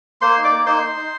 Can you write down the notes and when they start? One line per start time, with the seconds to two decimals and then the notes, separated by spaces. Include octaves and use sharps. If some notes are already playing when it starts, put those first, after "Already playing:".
0.21 A#3 C5 C6
0.37 D#4
0.44 D5 D6
0.52 A#3
0.66 D#4 C5 C6
0.82 D#4
0.97 D#4